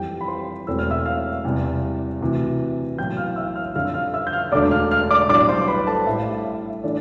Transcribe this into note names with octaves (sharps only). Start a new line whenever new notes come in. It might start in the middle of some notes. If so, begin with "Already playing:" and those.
Already playing: F2 E3 G3 C4 G4 G5
B5
C5 C6
E1 E2 B2 A3 C4 E6
F6
E5 E6
F5 F6
E2 C3 G3
D2 C3 E3
B1 A2 E3 G5 G6
F5 F6
E5 E6
F5 F6
F2 D3 G3 F5 F6
E6
F5 F6
E5 E6
G6
F5 F6
E1 D2 D3 A3 D4 D5 D6
F5 F6
F5 F6
D5 D6
B1 A2 G3 D4 D5 D6
C5 C6
B4 B5
A4 A5
A1 A2 G3 E5
F5
E5
E5
E3 A3 D4 D5